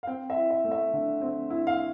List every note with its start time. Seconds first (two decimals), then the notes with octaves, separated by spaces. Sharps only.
0.03 F5
0.07 C4 G5
0.30 E5
0.36 E4
0.51 E5
0.65 A3
0.72 E5
0.93 D3
1.21 C4
1.50 E4
1.67 F5